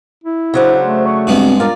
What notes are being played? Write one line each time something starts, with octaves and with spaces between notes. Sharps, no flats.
E4
C#3 F#3 D4 C5
A3
C#6
G2 G#3 B3 C4
F4 A#4 D5